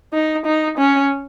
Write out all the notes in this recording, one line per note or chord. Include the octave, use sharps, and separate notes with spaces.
D#4
D#4
C#4